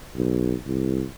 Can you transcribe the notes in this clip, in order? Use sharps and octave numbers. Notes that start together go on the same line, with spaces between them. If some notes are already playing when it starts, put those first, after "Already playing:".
B1
C2